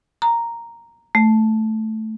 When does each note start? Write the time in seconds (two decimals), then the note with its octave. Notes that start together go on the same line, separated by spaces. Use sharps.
0.22 A#5
1.15 A3